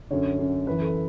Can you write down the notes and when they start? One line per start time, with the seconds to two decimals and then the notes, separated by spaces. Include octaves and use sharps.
0.11 F#2 D3 C#5
0.39 F#2 D3
0.67 F#2 E3 B4
0.81 A4